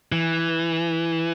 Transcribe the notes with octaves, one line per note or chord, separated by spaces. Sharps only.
E3